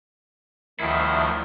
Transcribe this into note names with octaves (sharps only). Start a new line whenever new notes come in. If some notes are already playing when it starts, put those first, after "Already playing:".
D2 D#3 F3 E4